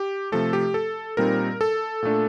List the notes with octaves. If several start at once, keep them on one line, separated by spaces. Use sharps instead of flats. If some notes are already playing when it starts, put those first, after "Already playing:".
Already playing: G4
C3 F3 A3 A4
G4
A4
A#2 G3 C4 D#4 A#4
A4
A#2 A3 D4